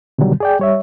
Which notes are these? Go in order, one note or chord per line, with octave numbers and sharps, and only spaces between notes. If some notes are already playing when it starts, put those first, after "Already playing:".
B2 D3 D#3 F#3 G3
G#4 D5 G5
G3 C#5 E5